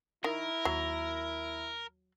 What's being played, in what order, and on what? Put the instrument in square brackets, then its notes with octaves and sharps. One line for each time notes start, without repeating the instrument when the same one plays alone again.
[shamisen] D#3 [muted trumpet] E4 [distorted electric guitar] A#4
[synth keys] D#2 [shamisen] F#3